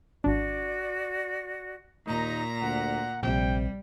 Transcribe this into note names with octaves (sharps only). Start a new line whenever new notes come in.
G#1 D4 F#4 D5
D#2 A#2 D#4 A#5
D2 F#5
A#1 C3 G3 G5